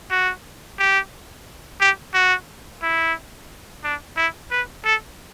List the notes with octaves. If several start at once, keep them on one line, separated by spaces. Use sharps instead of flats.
F#4
G4
G4
F#4
E4
D4
E4
B4
A4